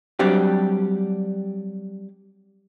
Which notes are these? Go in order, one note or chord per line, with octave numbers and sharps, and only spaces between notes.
F#3 G3 C4 D4 G4